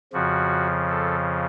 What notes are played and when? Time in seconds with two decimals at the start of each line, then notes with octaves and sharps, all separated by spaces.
0.13 F2 C#3 F3 F#4
0.90 A4